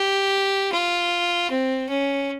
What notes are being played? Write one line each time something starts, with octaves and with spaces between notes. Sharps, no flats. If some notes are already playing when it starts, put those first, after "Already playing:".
Already playing: G4
F4
C4
C#4